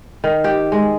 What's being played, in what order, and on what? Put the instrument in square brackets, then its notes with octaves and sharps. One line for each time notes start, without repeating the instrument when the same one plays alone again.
[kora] D#3
G4
G#3